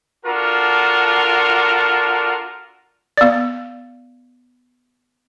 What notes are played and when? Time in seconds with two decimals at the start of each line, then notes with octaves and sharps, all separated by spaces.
0.25 D4 F4 F#4 A4 A#4
3.17 B3 D5